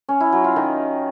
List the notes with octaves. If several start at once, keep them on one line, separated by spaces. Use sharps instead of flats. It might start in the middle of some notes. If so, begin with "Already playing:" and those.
C#4
E4
F#3
F4
D#3